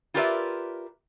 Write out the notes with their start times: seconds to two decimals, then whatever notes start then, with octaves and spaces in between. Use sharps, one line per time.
0.14 F4 G4 A#4 B4 D5 E5